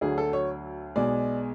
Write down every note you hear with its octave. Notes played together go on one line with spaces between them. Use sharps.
D2 D3 F#3 G#4
A4
C#5
B1 B2 G#3 D5